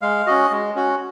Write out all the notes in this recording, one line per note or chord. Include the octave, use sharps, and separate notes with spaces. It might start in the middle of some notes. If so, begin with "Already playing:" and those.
G#3 F5
C#4 F#4 D#5
G#3
C#4 F#4